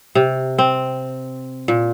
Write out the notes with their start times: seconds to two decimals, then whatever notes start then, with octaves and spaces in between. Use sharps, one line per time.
0.15 C3
0.58 C4
1.68 A#2